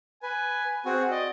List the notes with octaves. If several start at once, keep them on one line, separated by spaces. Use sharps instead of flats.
B4 G#5
C4 F#4 G#4
D5 D#5